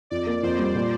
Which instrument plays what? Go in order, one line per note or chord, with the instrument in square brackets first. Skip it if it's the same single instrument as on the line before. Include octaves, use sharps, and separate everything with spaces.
[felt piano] F2 [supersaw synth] D5
[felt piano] A#3
[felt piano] F2 [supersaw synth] C5
[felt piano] G3
A#2